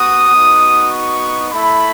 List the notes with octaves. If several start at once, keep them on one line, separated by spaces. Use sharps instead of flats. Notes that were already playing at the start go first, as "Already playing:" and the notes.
Already playing: B3 F#4 D#6
B3 D#4 F#4
C#6
A3 E4 B5